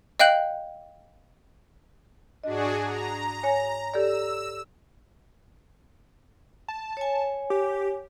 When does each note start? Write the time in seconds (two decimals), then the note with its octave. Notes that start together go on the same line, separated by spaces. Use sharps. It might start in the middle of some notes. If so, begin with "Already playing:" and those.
0.20 D#5 F5 G5 F#6 G6 F#7
2.44 G#2 D4 F#4 G#4 D#5
2.85 A#5
3.43 C#5 G#5
3.94 G4 A4 D5 E6
6.68 A5
6.97 C#5 G#5
7.50 G4